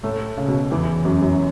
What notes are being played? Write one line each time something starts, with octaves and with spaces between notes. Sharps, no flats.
A2 A3
C#3
B2
E2 E3
F#2 F#3
F#2 F#3